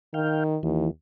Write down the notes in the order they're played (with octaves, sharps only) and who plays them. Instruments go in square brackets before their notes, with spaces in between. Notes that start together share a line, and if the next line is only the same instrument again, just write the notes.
[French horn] D#3 [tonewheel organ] F5 G5
[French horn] D#2 [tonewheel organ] E3